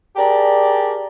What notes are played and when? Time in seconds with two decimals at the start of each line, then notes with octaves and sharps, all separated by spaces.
0.17 G4 G#4 A#4 D5 A5